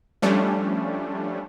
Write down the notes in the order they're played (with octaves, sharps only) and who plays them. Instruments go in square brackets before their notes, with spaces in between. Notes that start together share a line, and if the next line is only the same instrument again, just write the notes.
[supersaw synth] F3 G3 A3 C#4 D4